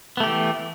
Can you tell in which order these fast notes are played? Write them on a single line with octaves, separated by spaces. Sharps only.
B3 A3 G4 E3